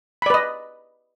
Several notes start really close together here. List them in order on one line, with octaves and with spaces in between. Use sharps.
B5 D5 B4 D#5